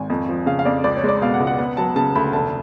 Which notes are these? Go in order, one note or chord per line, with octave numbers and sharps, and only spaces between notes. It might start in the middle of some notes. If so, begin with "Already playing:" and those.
Already playing: G#1 G#5
F2
F3
C#3 F5
F5
F2 D5
C#2 D5
C#5
G#3
D5
B2 F5
F#5
C#2
F#5
B3 F#5
F#3 A5
C#3 A5
D2 B5
F1 A5